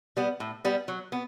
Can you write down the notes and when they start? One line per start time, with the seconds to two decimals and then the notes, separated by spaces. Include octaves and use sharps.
0.17 G3 B3
0.40 A2
0.65 G3 B3
0.88 F#3
1.12 B3